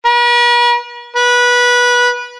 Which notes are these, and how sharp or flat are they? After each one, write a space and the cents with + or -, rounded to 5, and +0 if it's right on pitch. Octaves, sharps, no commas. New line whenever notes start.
B4 -45
B4 -20